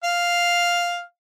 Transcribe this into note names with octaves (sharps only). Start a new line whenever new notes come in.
F5